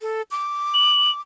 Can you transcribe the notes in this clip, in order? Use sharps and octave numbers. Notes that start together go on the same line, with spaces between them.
A4
D6
F#7